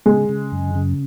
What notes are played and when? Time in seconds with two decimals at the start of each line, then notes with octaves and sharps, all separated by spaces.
0.06 C#3 G#3
0.29 C#3
0.52 F#2
0.75 C#3